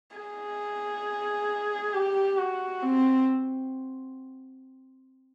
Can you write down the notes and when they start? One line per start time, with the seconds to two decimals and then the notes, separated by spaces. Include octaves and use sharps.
0.17 G#4
1.94 G4
2.38 F#4
2.83 C4